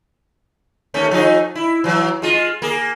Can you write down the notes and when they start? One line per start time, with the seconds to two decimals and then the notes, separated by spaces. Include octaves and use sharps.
0.94 D#2 A3 C#4
1.11 F3 D#4 G#4
1.55 E4
1.84 E3 F#3
2.22 G#3 F4
2.62 A#3 G#4